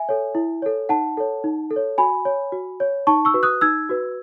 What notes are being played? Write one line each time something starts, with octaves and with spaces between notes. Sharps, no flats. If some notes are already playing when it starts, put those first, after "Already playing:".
Already playing: E5 G#5
A4 C#5
E4
A4 C#5
D#4 F#5 A5
A4 C#5
D#4
A4
C#5
F#4 G#5 B5
C#5
F#4
C#5
D#4 A5 C#6
C#6 E6
F#4 B4
D#6 F#6
D#4 E6 G#6
F#4 B4